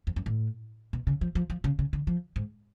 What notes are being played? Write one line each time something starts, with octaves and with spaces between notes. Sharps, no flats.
F2
F#2
A2
B2
C#3
F3
F3
F3
C#3
C#3
D3
F3
G#2